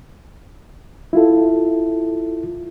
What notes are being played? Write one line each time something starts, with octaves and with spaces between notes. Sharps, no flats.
E4 F4 A4